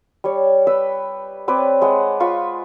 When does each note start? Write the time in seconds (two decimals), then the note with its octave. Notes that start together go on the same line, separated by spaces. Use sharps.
0.24 G3 C#5
0.67 B4 G5 B5 E6
1.48 C4 B4 C#5 D5
1.82 G#3 B4 F#5
2.20 F4 B5 C#6